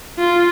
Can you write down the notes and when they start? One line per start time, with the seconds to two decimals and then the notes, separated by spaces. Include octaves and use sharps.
0.19 F4